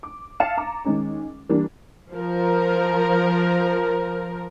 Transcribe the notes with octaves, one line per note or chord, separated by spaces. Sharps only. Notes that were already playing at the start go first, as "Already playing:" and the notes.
D6
E5 F5 A5 A6 C#7 E7
A#5 D6
D#3 G#3 C#4
E3 G3 A#3 D4
F3 A#4